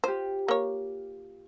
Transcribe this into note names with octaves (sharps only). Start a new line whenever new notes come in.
F4 G4 C5
A#3 C#5